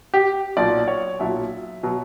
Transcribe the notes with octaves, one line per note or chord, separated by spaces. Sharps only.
G4
B1 A#2 F#3 D5
C#5
B1 A#2 F#3 E5
B2 F#3